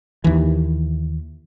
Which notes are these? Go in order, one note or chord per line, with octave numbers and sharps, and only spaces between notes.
D#2 E3